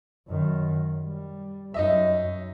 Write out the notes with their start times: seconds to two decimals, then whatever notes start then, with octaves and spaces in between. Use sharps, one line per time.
0.29 F#2 D#3
1.04 G3
1.74 F#2 D#4 D#5 E5